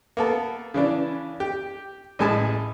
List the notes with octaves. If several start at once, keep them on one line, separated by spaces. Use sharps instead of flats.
A#3 B3 A4
C#3 E3 D4
G4
A1 A2 G#3 G#5 A5